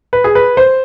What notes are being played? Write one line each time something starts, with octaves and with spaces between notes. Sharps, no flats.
B4
G#4
B4
C5